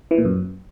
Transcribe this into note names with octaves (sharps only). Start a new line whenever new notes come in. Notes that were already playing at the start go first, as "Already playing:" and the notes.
E3
A#2
F#2